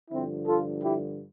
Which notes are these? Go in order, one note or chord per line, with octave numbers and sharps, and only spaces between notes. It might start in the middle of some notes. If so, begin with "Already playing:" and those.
G2 D3 F3 C4 E4
F4 A4
E4 G4